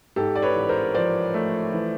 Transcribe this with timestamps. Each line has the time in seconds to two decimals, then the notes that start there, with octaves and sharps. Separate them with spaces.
0.16 G#2 G4 A4
0.35 D5
0.42 B4 C#5
0.56 A1
0.69 A#4 C5
0.95 F3 C5 D5
1.34 A3
1.73 E3